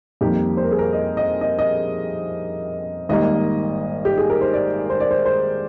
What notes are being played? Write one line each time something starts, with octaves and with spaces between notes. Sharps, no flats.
F2 D#3 G3 A#3 G4
C5
A#4
G#4
A#4
D#5
D#5
D#5
D#5
G#1 G#2 G3 A#3 D#5
G4
G#4
A#4
C5
D5
C5
D5
C5
C5